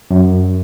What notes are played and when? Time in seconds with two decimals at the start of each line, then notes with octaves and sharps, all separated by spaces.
0.11 F#2